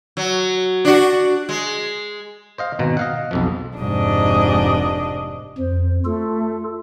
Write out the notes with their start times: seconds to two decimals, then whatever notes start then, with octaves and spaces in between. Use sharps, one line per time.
0.17 F#3
0.85 D4 F#4
1.49 G#3
2.58 C5 D#5 F5
2.79 G#1 B2 A#5
2.97 D#5 F5 F#5
3.31 B1 F2 F3
3.80 F1 G#2 D4 D#5
5.58 F2 C5
6.05 A3 F4 A4